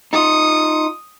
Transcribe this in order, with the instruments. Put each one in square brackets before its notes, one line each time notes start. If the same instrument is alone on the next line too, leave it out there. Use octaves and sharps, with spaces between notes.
[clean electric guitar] D#4 F4 [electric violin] D#6 C#7